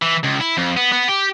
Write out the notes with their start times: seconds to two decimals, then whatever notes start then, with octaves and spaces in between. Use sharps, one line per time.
0.02 E3
0.23 C#2
0.40 E4
0.57 F2
0.77 B3
0.93 B3
1.09 G4